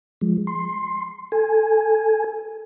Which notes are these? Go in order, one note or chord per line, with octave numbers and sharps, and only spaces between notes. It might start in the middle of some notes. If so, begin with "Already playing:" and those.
F3 G#3
C6
A4 G#5